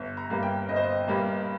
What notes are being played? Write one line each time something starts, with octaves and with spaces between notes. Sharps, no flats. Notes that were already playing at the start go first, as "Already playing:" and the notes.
Already playing: G1
A#5
G2 G3 A#3
G5
G1 D#5
C5
D#5
G2 G3 A#3